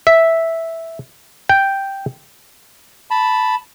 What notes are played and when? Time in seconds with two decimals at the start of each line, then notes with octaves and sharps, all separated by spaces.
0.07 E5
1.49 G5
3.11 A5 B5